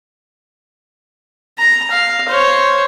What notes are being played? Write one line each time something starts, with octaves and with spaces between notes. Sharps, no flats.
A#5
F5
C5 C#5